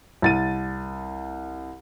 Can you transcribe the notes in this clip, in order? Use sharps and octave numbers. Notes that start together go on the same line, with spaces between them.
C2 A6 D#7